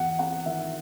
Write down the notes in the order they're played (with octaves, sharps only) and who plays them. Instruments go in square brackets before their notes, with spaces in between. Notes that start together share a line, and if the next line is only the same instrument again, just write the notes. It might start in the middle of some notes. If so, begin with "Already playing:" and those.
Already playing: [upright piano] E2 F#5
C4 F#5
D#3 E5